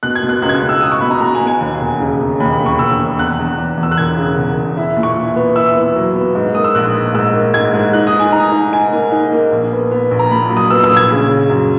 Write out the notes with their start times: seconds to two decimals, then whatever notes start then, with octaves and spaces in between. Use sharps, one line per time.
0.03 B2 F#6
0.15 G#6
0.23 B2
0.29 F#6
0.42 C#2 F#6
0.49 G#6
0.55 F#6
0.62 C#2
0.69 E6
0.81 C#2 D#6
0.92 C#6
1.01 B2 B5
1.11 A#5
1.21 B2 A#5
1.35 G#5
1.41 B2
1.47 G#5
1.60 D#2
1.81 E1
2.00 C#3
2.20 E1
2.40 D#2 B5
2.52 B5
2.60 E1
2.66 C#6
2.79 E1 E6
2.98 E1
3.19 E2 F#6
3.39 E2
3.58 E2
3.78 E2
3.83 E6
3.91 F#6
3.97 E1 G#6
4.17 C#3
4.38 E1
4.57 E1
4.77 E4
4.97 A#2
5.03 C#6
5.17 E4
5.36 B3
5.56 E4 E6
5.76 B3
5.96 F#3
6.16 B3
6.35 G#2
6.55 A#3 D#6
6.64 E6
6.75 A#1 F#6
6.95 G#2
7.14 G#2 E6
7.34 A#3
7.54 G#2 G#6
7.74 G#2
7.93 D#4 F#6
8.07 D#6
8.13 D#4
8.19 G#5
8.32 D#4 A#5
8.52 D#4
8.72 D#4 G#5
8.93 A#3
9.12 D#4
9.32 A#3
9.52 A#1
9.72 B3
9.91 B3
10.11 A#1
10.19 A#5
10.31 A#2 B5
10.50 F#3
10.57 D#6
10.70 B3 E6
10.84 E6
10.91 A#1
10.97 G#6
11.10 C#3
11.29 C#3
11.50 F#2